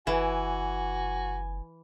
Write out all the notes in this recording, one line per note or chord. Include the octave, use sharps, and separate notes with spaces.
F#1 E3 F#4 G#5